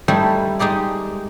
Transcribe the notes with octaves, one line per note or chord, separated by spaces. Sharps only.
G3 A3 D#4 E4 C5
G#3 D#4 G4 D5